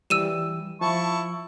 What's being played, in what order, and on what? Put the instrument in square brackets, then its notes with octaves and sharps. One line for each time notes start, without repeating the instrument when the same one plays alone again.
[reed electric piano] E3 G3 [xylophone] E6 D#7 E7
[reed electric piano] F3 [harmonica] E4 A5 C#6